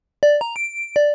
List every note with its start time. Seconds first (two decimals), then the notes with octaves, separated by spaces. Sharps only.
0.23 D5
0.41 A#5
0.56 D7
0.96 D5